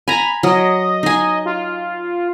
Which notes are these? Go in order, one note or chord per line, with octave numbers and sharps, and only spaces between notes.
G#5 A#5 B5
F#3 D#5
D#4 G#5
F4